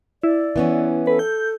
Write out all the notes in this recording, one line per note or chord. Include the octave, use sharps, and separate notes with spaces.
E4 D5
E3 B3 C#4
A4 B4
G6